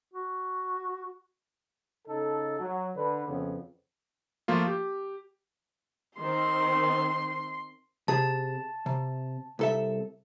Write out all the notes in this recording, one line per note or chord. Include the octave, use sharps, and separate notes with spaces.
F#4
C#3 D#4 A4
F#3
D3 B4
F2 C#3 B3
F3 A3 A#3 F4
G4
D#3 C4 C6
C3 G#4 A5
C3
C2 A4 E5